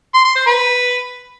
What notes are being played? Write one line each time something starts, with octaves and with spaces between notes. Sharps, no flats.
C6
C6
C5
B4